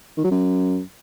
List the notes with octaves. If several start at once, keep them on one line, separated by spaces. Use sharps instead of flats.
D#3
F#3
F#2